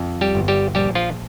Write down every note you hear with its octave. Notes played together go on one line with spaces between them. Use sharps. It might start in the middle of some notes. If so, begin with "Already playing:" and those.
Already playing: F2
G3 G4
G1
G3 G4
A#1 G3 G4
F3 F4